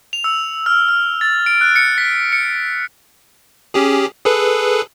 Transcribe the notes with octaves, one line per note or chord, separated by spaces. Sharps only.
F7
E6
F6
F6
A6
D7
F#6
C#7
B6
C#7
C#4 G4 G#4
G#4 A4 B4